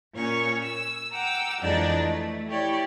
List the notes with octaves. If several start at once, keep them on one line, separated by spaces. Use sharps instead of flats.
A#2 C#4 C#5 C#6
E6
F#5 G5 A#5 D6 E6
F2 E3 G#3 D4 D#4 D5
A3
E4 G4 C#5 D5